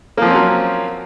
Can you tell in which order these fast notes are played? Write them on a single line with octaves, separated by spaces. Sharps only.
A#3 F3 C4 C#4 F#3